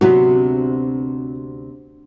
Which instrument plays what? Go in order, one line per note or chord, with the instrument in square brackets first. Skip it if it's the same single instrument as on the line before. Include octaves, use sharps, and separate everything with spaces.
[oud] D2 C3 B3 [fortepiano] F#3